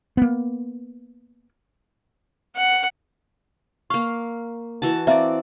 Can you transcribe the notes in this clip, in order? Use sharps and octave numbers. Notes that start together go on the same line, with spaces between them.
A#3 B3
F#5
A#3 F5 C#6
E3 F#4 A5
C4 D5 E5 F5 A#5